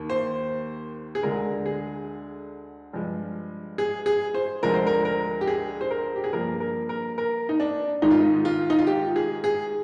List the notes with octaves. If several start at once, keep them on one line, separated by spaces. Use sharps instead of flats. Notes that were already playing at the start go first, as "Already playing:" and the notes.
Already playing: D#2 D#3 A#3
C5
G#4
D2 D3 G#3 A#4
G#4
G2 F3 G#3
G#4
G#4
C5
D2 D3 F3 G#3 A#4
C5
A#4
A#4
G4
G#4
C5
A#4
G4
G#4
G2 F3 A#3 A#4
A#4
A#4
A#4
D#4
D4
G#2 D#3 G#3 D#4
F4
D#4
F4
D#4
F4
G4
G#4
G#4